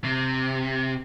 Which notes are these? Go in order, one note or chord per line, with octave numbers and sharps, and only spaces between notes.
C3